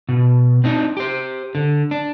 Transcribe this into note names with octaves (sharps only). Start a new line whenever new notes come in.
B2
C4 D4 D#4
G4 C5
D3
D4